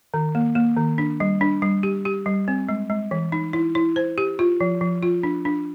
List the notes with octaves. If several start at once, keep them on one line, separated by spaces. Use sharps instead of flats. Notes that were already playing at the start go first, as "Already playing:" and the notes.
D#3
A#3
A#3
D#3
D4
G3
D4
G3
G4
G4
G3
C4
G#3
G#3
E3
D#4
E4
E4
C5
G4
F4
F3
F3
F4
D4
D4